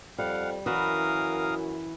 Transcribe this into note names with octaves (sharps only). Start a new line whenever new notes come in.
F2 G3 F5 F#5
F#2 E3 F#4 A#4 F5 D#6